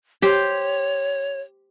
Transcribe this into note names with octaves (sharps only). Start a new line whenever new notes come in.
G4 C5 C#5